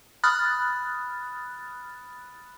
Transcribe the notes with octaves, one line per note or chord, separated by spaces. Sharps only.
B5 D#6 F6 F#6 A6